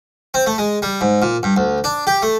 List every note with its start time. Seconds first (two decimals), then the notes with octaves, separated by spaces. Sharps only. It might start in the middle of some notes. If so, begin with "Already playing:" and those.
0.34 C4
0.46 A3
0.58 G#3
0.82 G3
1.01 G#2
1.22 A#2
1.43 G2
1.57 D2
1.84 D4
2.07 G4
2.22 A3